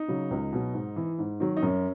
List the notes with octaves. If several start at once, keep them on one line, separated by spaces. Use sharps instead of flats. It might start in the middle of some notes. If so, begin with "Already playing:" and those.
Already playing: D#4
C#3 F#3
C#2
B2 F#3
G#2
E3
G#2
D#3 F#3
D#4
F#2 C#4